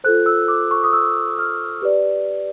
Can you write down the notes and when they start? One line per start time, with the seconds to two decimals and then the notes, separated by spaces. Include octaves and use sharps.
0.04 F4 A4 C5 F#6
0.26 E6
0.48 D6
0.71 C#6
0.84 D#6
0.93 E6
1.38 F6
1.82 G4 B4 D5